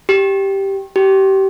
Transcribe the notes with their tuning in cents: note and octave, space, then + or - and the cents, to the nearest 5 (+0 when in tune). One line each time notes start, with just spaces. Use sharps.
G4 -5
G4 -25